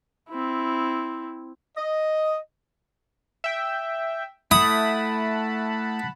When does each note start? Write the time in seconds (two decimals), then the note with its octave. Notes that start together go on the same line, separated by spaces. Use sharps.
0.29 C4 E4
1.76 D#5
3.44 E5 G5
4.51 A3 E4 F#5 A5 B5 D#6